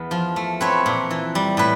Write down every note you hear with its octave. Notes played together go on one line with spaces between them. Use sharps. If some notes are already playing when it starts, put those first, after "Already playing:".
Already playing: E2 B3
F3
A3
C4 B4 C#5
A#2
E3
G3
A2 B4